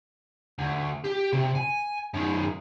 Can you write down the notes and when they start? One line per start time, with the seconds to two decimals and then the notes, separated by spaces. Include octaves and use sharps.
0.59 D2
1.04 G4
1.33 C3
1.55 G#5
2.14 F#2 D#3